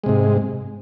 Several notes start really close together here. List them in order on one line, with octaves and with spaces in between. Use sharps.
G#3 C3 G#2